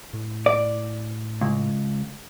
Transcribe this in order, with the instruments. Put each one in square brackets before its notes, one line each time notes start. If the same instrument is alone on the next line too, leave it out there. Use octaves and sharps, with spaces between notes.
[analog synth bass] A2
[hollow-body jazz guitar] D5
C#2